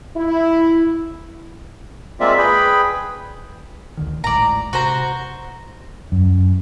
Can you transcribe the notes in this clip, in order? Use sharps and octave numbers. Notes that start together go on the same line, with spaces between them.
E4
G#3 A#3 C4 F4 D5 E5
G#4 B4 G5 B5
D2 D3 D#3
G#1 A2 G#3 D5 A#5
C3 F#4 C5 A#5
F#2